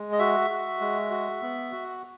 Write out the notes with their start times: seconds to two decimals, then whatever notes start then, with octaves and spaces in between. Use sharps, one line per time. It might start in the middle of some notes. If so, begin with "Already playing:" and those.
Already playing: G#3
0.12 D#5
0.19 F#4 E5
0.50 F#4
0.80 G#3
1.11 F#4
1.41 B3
1.72 F#4